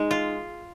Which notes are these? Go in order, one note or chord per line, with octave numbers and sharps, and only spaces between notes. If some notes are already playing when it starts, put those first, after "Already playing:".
Already playing: G#3 D#4 G#4
F4